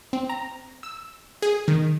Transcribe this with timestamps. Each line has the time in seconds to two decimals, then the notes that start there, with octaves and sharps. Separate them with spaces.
0.13 C4
0.29 A#5
0.83 E6
1.42 G#4
1.68 D#3